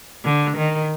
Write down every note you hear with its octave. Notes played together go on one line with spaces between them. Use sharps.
D3
D#3